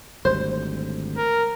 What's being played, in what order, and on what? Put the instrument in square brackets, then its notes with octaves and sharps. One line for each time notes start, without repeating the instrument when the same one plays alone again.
[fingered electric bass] G#1 D2 G3 [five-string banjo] C5
[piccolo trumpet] A#4